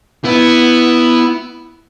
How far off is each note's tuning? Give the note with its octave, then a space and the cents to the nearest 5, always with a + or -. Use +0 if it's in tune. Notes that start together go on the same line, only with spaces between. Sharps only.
B3 +0 E4 +0